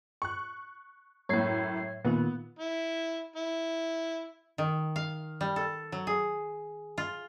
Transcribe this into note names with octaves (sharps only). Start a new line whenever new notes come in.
C#6 F#6
F#2 A2 C#5 G#6 C7
A#2 D#3 B3 F4
E4
E4
D#3
F5
G3
A4
F#3
G#4
F4